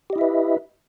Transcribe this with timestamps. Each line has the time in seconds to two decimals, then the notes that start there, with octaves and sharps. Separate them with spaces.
0.10 G4
0.13 D#5
0.15 E4
0.18 E5
0.21 B4